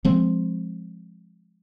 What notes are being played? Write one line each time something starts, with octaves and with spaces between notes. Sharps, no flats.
F3 G#3 C4